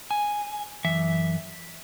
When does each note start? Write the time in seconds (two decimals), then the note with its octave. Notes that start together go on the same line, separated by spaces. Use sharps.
0.11 G#5
0.84 F#2 E3 E5